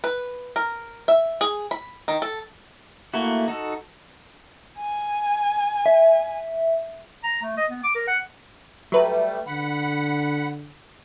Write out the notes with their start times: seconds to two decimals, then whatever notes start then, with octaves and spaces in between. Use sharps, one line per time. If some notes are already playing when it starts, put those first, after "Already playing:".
0.04 B4
0.56 A#4
1.08 E5
1.41 G#4
1.71 B5
2.08 D#3
2.22 A4
3.14 A3 A#3 E4 F#4
3.48 D#4 F#4 A4
4.79 G#5
5.86 E5
7.23 A#5
7.42 A3
7.57 D#5
7.70 B3
7.84 D6
7.95 A#4
8.07 F#5
8.92 F#3 G3 A3 B4
9.47 D3 F#5 B5